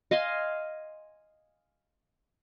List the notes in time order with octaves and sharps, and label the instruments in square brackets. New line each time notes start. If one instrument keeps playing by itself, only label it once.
[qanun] D#5 F5 G#5 C6